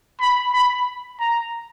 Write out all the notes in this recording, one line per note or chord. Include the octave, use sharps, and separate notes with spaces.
B5
B5
A#5